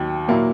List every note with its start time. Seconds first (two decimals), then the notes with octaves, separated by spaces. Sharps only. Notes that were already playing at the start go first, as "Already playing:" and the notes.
Already playing: D#2 D#3 F#3
0.28 A#2 F#3 A#3 E4